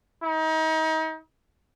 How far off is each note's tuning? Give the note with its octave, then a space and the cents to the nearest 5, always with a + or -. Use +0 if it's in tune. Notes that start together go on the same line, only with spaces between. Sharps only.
D#4 +35